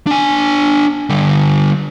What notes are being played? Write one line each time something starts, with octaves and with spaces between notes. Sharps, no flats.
D4 G#5
D3 G3